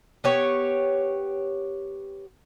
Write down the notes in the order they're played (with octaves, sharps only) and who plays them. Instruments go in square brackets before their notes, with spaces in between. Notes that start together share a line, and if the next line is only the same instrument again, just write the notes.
[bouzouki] B3 G4 C#5